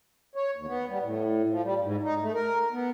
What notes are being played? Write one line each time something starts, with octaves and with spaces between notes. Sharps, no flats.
C#5
D#2
B3
G3
A2
F3
G3
G#2
D#4
A3
A#4
B3